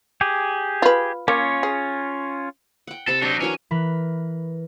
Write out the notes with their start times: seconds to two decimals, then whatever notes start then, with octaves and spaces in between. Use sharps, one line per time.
0.21 G4 G#4
0.82 F4 B4
1.28 A#3 C#4 F4 C#5
1.63 G#4
2.87 F#5 G5
3.07 C3 A4 B5
3.22 F#3 D4 D#4
3.41 E3 F#3 C#4 A#4
3.71 E3 A#4 B4 B5